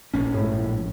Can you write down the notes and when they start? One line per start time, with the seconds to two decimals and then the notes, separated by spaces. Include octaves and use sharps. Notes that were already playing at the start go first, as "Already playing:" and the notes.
0.14 A#1 C#4
0.34 A2 G#3 E4